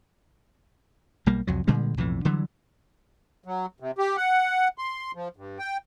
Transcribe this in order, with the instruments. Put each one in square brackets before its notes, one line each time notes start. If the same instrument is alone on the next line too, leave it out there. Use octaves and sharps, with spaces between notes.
[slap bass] B1 G3 A#3
C2 F2 F#3
A#2 D3 G3 G#3
B1 F2 A2 E3
D3 E3 F#3 G3
[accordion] F#3
C3
G4
F#5
C6
F3
G2
G5